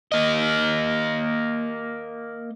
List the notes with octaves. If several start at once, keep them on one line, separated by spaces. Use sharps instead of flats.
A#3 D#5